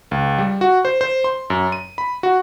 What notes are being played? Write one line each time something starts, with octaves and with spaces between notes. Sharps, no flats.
C#2
G3
F#4
C5
C5
C6
F#2
D#7
B5
F#4